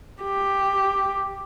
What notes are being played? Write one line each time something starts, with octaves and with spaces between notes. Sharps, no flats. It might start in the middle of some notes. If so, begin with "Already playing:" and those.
G4